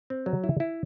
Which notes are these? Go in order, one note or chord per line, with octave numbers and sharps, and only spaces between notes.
C4
F#3
E4
E4